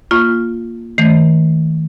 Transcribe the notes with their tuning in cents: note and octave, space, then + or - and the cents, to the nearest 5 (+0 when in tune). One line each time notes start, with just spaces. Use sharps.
A#3 +0 F4 +0 C#6 +0
D#3 +40 A3 +0